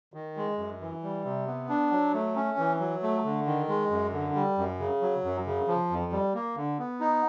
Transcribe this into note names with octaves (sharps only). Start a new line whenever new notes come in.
D#3
G#3
F#2
E3
G3
C3
B3
D4
F#3
A3
C#4
E3
F#3
A3
D3
D#3
G#3
F#2
D3
G3
F#2
C#3
F#3
F#2
C#3
F3
F2
G3
A#3
D3
B3
D#4